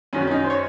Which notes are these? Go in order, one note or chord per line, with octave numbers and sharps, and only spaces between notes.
F#2 D#3 F#3 C#4
C#4
D#4
C5
C#5